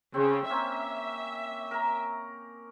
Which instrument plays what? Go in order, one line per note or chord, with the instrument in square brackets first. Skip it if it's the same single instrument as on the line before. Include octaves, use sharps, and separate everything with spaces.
[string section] C#3 [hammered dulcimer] C4
[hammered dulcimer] A#3 C4 C#4 [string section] E5
[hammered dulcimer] A#4 A#5